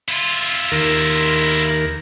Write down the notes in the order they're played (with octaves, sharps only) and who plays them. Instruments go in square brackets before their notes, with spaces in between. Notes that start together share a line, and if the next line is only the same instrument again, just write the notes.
[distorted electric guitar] E4 F4
[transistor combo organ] D#2 A#4